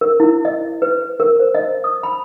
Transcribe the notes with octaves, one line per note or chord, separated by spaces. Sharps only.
A#4
E4
D#5
B4
A#4
C5
D#5
D#6
B5